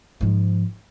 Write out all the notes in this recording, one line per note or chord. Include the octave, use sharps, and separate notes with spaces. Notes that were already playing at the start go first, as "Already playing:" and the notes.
G#2 F3